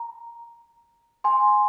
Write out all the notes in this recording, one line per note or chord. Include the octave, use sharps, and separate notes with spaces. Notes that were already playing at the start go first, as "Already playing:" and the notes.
Already playing: A#5
G#5 C6